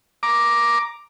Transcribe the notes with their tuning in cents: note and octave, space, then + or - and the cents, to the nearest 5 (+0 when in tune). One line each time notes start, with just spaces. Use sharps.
A#5 +5 D6 +0